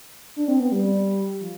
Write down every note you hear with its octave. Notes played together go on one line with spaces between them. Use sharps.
D4
C4
B3
G3
F3